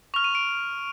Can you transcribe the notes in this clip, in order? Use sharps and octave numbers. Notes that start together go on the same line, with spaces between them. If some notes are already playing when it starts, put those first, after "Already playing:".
C#6 F6 F7
D#7
D7